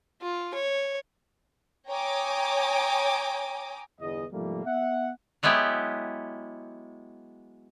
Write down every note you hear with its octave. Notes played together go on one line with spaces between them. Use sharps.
F4
C#5
C#5 G5 G#5 A#5 D6 D#6
G1 E2 D#5
C2 G#2 F3 G3 A3 A#3
B3 E5 F#5
F#3 G#3 B3 E4 G4